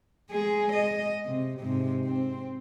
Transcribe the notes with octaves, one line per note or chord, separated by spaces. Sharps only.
G#3 G#4
D#5
C3
G#2 C3
C4